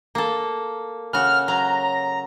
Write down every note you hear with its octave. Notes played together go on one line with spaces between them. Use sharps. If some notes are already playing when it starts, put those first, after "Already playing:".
A#3 A4
C#3 F#4 F6
F#3 A#5